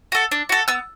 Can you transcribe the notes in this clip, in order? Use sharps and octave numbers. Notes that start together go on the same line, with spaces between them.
F#4 A4
D4
F#4 A4
B3 E6